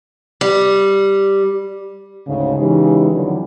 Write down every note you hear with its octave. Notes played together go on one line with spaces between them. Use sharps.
G3
D2 G#2 C#3
C#3 E3 G#3 D#4 G4
E2 D3 D#3 F3 F#3